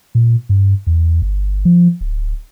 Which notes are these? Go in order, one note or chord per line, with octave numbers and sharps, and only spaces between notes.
A#2
G2
E2
G1
F3
D1